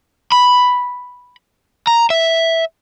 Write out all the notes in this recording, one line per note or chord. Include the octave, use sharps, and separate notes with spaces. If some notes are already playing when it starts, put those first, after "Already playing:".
B5
A#5
E5